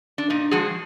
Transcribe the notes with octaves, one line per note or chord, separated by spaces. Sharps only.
D4
A#2 D#4
F3 G#3 F#4 G#4